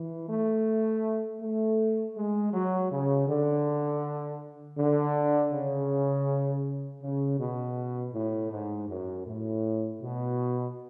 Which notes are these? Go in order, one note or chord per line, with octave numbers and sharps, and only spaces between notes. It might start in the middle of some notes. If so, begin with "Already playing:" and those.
Already playing: E3
A3
A3
G#3
F#3
C#3
D3
D3
C#3
C#3
B2
A2
G#2
F#2
A2
B2